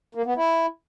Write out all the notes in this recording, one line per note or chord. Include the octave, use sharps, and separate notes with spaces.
A#3
B3
E4